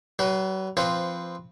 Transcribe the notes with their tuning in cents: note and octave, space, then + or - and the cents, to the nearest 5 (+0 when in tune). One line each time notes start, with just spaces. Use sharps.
F#3 +40 B4 +0
F3 -15 C4 +0 B4 +0